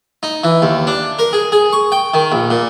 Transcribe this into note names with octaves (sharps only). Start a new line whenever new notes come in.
D#4
E3
D#2
D4
A#4
G#4
G#4
C#6
G5
D#3
A#1
A#2